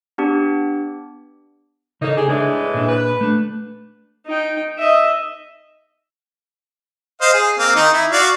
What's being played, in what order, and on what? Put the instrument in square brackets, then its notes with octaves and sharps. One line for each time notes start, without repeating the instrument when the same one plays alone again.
[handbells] B3 D4 G4
[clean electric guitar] C#3 A4 [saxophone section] A#3 D#4
[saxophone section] G4 G#4
[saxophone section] A2 E3 G#3 [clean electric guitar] D4 D5
[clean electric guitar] A#2 D4
[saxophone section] B4
[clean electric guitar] A3 D4
[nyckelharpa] D#4 G5
D#5 E5
[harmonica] C5 D#5 F5
G#4
A#3 C4 F5
D#3 D#4
E4
F#4 D5 F5